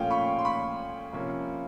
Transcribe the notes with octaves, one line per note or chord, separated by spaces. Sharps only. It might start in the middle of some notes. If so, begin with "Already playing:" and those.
Already playing: A#2 F3 A3 C#4 F5 G5
B5 C#6
C6
B5 C#6
C3 F3 A#3 C#4